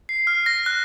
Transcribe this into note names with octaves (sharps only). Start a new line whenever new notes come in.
C7
F6
A#6
F#6